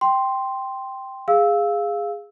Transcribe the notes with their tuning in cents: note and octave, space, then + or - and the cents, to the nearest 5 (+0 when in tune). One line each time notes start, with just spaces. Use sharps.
G5 +0 C6 +0
G#4 -10 F5 +0 E6 -10